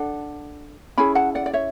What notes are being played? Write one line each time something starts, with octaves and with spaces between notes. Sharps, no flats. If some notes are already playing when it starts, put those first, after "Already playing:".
Already playing: D4 A4 F#5
C#4 E4 G#4 G#5 B5
F#5 A5
D5 F#5
D5
C#5 E5